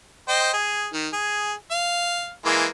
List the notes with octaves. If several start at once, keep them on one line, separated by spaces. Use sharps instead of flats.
C5 D#5 G5
G#4
D#3
G#4
F5
E3 G#3 A#3